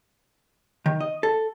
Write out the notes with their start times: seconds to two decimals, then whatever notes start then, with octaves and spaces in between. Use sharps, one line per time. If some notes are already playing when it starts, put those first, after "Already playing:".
0.86 D#3
1.00 D#5
1.23 A4